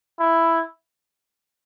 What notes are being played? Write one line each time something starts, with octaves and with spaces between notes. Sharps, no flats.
E4